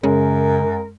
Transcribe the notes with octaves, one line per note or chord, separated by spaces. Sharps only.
F#2 C#3 G#3 A#4